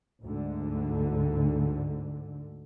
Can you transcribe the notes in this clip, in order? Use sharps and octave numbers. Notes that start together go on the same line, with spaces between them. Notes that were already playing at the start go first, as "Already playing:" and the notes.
D2 G#2 D3